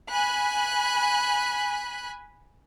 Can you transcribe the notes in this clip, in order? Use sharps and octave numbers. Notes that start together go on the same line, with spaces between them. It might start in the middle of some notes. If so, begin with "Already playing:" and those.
G#5 B5 F#6